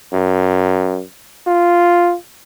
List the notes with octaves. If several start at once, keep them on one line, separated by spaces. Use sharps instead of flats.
F#2
F4